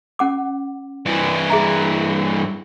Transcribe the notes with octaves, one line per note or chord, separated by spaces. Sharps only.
C#4 F#5 D6
G2 E3
G#4 E5 A#5